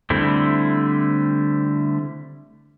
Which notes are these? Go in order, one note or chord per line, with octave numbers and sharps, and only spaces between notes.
D3 G3 A3 C4 E4